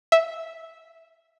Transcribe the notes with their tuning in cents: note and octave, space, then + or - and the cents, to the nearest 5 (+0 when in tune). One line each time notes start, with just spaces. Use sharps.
E5 -10